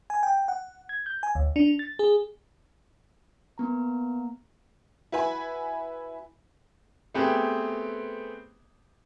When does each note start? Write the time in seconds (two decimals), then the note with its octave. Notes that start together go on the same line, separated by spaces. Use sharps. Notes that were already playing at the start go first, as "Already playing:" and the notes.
0.10 G#5
0.23 G5
0.48 F#5
0.89 G#6
1.06 G6
1.23 G#5
1.35 D2
1.56 D4
1.79 A6
1.99 G#4
3.58 A#3 B3 A#5
5.12 E4 F#4 B4 G#5 B5
7.14 A3 B3 C4 G4 G#4 B4